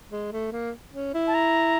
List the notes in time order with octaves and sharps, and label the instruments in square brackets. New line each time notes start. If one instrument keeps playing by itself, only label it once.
[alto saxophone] G#3
A3
A#3
C#4
E4
[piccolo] A5
A#5